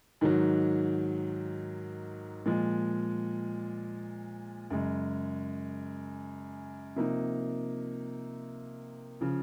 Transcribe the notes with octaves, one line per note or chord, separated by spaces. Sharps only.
G#2 D#3 F#3
A#2 F3 G#3
F#2 C#3 G#3
C3 F3 A#3 D#4
C#3 F3